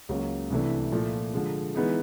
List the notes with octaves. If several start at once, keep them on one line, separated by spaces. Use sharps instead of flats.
C#2 C#3 F#3 A#3
C2 C3 E3 A3 D4
A#2 F3 A3
D3 F3 G#3
E3 G#3 B3 D#4 G#4